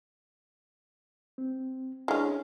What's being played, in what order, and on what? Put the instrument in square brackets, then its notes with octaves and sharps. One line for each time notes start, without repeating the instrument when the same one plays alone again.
[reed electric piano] C4
[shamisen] G#3 C#4 [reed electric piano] D4 E4